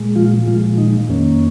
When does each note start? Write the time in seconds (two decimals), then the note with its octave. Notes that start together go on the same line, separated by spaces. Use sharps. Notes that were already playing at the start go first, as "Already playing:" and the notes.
Already playing: A#2 G#3
0.16 F3 F4
0.47 A#2 F3 G#3 F4
0.77 D#3 D#4
1.09 F2 D#3 A#3 C#4